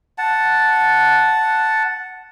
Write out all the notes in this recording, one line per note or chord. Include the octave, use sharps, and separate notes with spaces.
F#5 A5